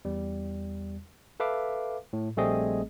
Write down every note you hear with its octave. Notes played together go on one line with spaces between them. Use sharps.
E2 G3
A4 B4 E5 F5 D6
A2
A#1 G3 A3 C4 G#4 D#5